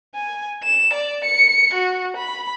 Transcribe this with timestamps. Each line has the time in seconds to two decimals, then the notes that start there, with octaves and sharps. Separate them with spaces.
0.15 G#5
0.64 E7
0.94 D5
1.25 C#7
1.74 F#4
2.17 B5